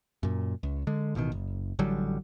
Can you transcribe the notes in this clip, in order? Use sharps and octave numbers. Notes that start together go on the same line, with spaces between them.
F#2 A#2
C#2
D3 G#3
A1 G2 B2 D#3
F#1
A1 D3 F#3 G3